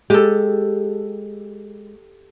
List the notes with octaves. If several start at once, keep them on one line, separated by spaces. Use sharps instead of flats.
G#3 G4 A4